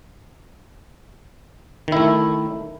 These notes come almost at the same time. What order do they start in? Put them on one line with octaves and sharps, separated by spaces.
D#3 E4 A3